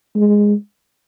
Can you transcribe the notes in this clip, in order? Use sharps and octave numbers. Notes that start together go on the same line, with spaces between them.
G#3